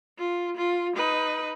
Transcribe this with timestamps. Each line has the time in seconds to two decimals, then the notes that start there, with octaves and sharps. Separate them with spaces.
0.19 F4
0.57 F4
0.96 D#4 B4